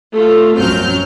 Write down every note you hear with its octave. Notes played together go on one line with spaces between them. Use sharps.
A3 F4
A#1 F#2 F#3 C4 F6 G6